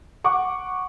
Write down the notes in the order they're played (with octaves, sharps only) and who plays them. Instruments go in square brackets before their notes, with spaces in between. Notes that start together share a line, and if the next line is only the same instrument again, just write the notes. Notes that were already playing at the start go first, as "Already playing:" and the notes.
[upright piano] F#5 C#6 D6